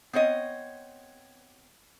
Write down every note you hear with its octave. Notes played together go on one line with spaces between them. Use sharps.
B3 C4 C#5 D#5